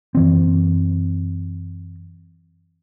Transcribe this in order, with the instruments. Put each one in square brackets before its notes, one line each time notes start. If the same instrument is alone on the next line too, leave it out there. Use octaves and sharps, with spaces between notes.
[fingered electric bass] F#2 E3 C4